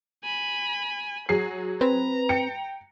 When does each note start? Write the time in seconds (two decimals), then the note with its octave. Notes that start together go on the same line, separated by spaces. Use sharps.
0.23 G#5 B5
1.29 F#3 F#4 G#4 C7
1.81 C4 B4 A#5
2.29 G5 C#7